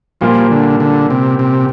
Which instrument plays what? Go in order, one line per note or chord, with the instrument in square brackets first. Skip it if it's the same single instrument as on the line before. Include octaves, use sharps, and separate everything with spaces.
[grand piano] A#2 G3 A#3 [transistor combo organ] F3
[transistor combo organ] D3
D3
C3
C3